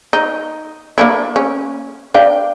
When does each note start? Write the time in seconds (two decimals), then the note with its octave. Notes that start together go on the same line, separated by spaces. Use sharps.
0.13 D#4
0.98 A#3 D4 E4
1.36 C#4
2.14 D4 F5 G5